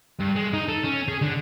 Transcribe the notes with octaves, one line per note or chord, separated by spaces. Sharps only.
G2
G#3
D#4
A4
C#4
G#4
D3